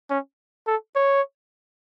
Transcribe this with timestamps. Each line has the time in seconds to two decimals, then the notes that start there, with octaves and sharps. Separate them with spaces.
0.10 C#4
0.67 A4
0.96 C#5